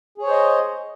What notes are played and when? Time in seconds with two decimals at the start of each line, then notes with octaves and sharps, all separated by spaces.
0.18 G#4
0.22 C#5
0.27 C5
0.31 D#5